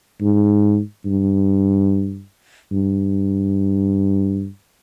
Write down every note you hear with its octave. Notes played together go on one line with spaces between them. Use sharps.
G#2
G2
G2